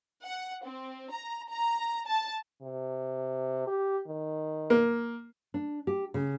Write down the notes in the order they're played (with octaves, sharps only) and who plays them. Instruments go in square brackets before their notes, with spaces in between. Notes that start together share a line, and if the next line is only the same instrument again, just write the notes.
[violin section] F#5
C4
A#5
A#5
A5
[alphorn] C3
G4
D#3
[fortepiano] A#3
[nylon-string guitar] D4
G4
C#3